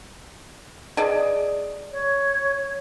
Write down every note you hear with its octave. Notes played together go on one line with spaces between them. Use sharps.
G#4 D5 D#5
C#5